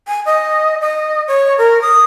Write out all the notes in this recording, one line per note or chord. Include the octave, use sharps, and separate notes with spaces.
G#5
D#5
D#5
C#5
A#4
D#6